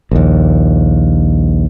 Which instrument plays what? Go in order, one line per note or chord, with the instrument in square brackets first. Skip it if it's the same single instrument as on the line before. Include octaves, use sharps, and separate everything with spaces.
[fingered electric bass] A#1 D#2